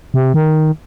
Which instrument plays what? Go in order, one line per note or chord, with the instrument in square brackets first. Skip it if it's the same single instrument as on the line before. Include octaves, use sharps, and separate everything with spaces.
[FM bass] C3
D#3